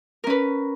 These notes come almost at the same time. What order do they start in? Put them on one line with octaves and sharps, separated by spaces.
A#4 C#4 B4